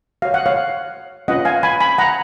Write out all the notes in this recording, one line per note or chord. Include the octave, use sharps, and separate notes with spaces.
F#4 C#5 F5
F#5
C#5 F5
C#4 F4 B4 D#5 F#5
F5 G#5
G#5 B5
G#5 B5
F#5 A#5